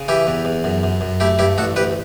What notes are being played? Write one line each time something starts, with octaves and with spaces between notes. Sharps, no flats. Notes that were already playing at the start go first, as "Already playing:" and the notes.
Already playing: C#3
E3 E4 G4
E2
E2
F#2
F#2
F#2
A3 E4 G4
G2 E4 G4
A1 F#4 A4
D2 G4 B4